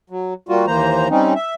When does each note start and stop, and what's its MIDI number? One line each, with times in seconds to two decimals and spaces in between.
0.10 0.34 54
0.49 0.66 55
0.49 0.66 58
0.49 0.66 65
0.49 0.66 66
0.67 1.08 39
0.67 1.08 52
0.67 1.08 58
0.67 1.08 72
0.67 1.08 82
1.10 1.33 55
1.10 1.33 60
1.10 1.33 61
1.10 1.33 63
1.35 1.54 76